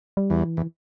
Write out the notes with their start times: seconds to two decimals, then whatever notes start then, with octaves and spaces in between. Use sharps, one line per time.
0.17 G3
0.30 E2
0.44 E3
0.57 E2